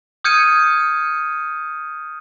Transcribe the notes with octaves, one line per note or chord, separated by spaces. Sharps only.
D#6 F6 G6 G#6 C#7 D#7